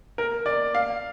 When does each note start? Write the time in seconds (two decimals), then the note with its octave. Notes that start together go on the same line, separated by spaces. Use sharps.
0.18 A#4
0.46 D5
0.75 F5